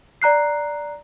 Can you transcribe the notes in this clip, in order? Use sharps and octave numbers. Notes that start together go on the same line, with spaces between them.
D5 A#5 F#6 C7